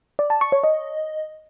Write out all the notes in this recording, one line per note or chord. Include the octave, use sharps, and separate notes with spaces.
D5
A5
C#6
C#5
D#5